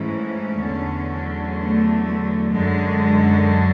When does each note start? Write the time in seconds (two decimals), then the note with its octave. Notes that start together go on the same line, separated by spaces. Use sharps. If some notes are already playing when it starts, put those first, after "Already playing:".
Already playing: G#2 E3 A3 C#4
0.61 E2 D3 F#3
1.56 A3
2.03 A3
2.51 F#2 D3 F#3 G#3